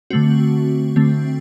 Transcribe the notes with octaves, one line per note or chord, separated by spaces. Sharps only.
D3 A3 C4 F#4
D3 A3 C4